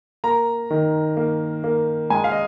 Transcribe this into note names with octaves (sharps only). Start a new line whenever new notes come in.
A#3 A#5
D#3
A#3
A#3
G#3 G#5
F5
D#5